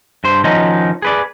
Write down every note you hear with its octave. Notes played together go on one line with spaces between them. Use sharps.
G2 C5 C6
D#3 F3 C#4 D#4 F#4
G#4 B4 D5